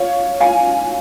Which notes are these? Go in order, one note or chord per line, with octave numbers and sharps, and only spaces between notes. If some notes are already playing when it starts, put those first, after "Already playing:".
Already playing: C#5 F5
F5 G#5